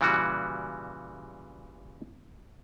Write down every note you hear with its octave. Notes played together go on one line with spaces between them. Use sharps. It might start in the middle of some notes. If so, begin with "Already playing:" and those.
A#2 C#3 E3 G3 F#4